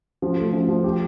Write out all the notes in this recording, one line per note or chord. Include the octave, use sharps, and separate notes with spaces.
F3
A3
F3
F3
G4